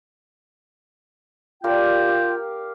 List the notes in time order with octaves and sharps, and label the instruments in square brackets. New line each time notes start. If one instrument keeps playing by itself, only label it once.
[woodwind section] F4 G5 [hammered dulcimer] G4 A#4 D5
[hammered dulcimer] G4 F5